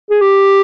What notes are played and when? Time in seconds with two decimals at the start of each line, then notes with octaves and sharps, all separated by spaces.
0.10 G#4
0.21 G4